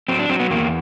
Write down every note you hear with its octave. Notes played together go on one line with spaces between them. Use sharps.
F#3 C4
D4
F#3 C4
B3
E2 A#3